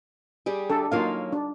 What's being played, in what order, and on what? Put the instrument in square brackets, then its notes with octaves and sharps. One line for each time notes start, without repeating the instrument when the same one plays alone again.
[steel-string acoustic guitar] G3 G4 G#4
[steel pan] D4 A4
[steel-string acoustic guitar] F#3 A#3 C#4 [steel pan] D#4 F4 F5
[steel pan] D4